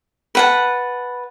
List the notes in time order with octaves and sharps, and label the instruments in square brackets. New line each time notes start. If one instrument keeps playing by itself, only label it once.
[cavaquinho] B4 F#5 A5